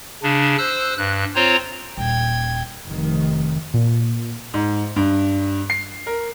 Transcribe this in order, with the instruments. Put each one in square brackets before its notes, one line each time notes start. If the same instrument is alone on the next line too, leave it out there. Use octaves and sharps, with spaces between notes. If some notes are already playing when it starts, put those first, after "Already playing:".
[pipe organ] C#3 D4
C5 E6 F#6
G2 F#6
C4 F4 C5 C#5 A#5
[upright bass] D#1 [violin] G5 G#6
[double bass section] F1 D#3
[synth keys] A#2
[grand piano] G#2
G2
C7
A#4